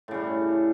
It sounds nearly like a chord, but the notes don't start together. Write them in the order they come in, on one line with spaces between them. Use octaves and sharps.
A2 C#3 G3